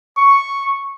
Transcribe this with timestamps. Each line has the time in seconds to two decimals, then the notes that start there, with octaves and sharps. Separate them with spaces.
0.17 C#6